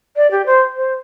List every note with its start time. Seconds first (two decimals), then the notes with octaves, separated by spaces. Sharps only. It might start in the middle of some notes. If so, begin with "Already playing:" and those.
0.16 D5
0.31 G4
0.46 C5
0.77 C5